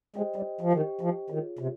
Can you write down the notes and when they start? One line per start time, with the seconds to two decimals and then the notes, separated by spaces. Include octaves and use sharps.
0.16 G#3 G4 C5 D#5 G5
0.36 G3
0.61 F3
0.73 D#3 G4 C5 D#5 G5
1.01 F3
1.30 D#3 F4 G#4 C#5
1.59 C3